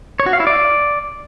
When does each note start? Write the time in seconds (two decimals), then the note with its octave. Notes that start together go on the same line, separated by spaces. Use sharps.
0.20 C#5
0.26 F#4
0.33 F5
0.40 E4
0.47 D5